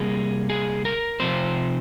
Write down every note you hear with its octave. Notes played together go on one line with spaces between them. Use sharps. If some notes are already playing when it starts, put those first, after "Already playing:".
Already playing: C3 G3 A#3 G#4
G#4
A#4
C3 F3 C4 C5